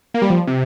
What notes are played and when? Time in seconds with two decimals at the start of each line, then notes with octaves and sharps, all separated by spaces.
0.14 A#3
0.22 G3
0.30 F3
0.47 C3